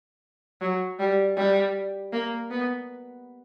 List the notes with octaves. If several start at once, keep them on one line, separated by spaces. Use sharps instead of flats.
F#3
G3
G3
A#3
B3